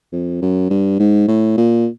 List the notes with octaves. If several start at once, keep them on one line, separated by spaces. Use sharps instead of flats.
F2
F#2
G2
G#2
A2
A#2